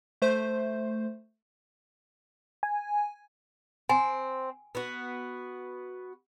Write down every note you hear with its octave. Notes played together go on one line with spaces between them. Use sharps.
A3 C5
G#5
C4 G#5
B3 F#4